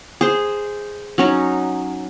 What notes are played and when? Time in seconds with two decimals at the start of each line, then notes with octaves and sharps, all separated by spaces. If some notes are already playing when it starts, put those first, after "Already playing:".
0.21 G#4 C5
1.18 F#3 C#4 D#4